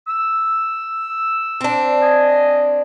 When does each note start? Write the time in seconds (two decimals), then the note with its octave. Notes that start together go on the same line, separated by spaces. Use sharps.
0.08 E6
1.61 C4 D4
2.02 D#5 G#5